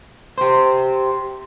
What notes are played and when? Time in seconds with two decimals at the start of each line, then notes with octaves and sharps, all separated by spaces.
0.38 G4 C5